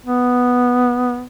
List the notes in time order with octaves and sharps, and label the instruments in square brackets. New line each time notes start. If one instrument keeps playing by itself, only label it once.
[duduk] B3